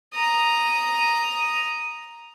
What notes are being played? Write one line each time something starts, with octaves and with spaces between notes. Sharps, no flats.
A#5 D#6